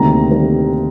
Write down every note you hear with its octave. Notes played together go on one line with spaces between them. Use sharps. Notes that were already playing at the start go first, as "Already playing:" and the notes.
Already playing: D2 C3 D#3 G3 A#3 A#5
C3 D#3 G3 A#3